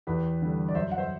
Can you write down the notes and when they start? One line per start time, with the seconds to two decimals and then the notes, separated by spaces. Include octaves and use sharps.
0.07 E2 G4 B4
0.42 D3 G3
0.68 D5
0.75 F#2 C5 E5
0.91 F#5
0.98 C5 E5